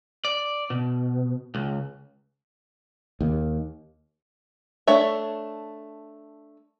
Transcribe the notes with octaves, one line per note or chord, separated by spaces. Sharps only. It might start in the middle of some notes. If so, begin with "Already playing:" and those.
D5
B2
C#2
D#2
A3 D4 C#5 E5